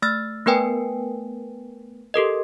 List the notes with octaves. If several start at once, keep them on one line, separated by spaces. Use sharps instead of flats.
A3 E6 F6 A6
A3 B3 A#4 B4 G5 G#5
G4 A4 A#4 D#5